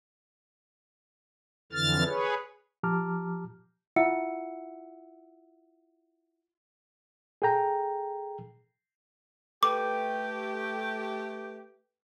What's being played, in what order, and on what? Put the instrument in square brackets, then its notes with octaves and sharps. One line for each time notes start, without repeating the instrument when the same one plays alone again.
[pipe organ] F2 D3 E3 F6 A6
G#4 B4 C#5
[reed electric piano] F3 G4 A5 A#5 D6 F6
[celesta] E4 F4 E5 F#5 E6 C#7
[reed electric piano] G#4 A4 G5 A#5
[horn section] A3 G4 [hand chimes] A4 B4 G5 [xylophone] D6